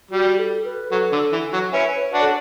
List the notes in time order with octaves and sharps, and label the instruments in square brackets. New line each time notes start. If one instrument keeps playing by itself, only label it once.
[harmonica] G3 [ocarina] F#4
[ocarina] A4
B4
[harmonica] F#3 [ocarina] A4
[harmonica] D3
E3
F#3
[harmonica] C#4 E4 [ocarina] B4
[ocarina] B4
C#5
[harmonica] D4 F#4
[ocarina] A4